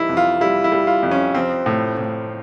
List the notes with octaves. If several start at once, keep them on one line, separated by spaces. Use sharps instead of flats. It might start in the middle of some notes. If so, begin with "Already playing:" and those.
Already playing: E3 G3 D#4 E4
F2
F4
G3 E4
E4
G3
F4
F2
C#4
F3 C4
A2
A2